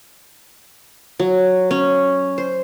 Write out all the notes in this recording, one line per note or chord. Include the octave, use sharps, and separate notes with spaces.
F#3
C#4
C5